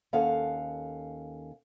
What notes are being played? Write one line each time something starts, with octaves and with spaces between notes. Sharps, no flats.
D#2 C#4 A4 F5 F#5